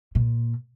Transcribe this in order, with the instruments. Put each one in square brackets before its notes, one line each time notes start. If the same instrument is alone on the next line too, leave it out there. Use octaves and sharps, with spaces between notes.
[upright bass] A#2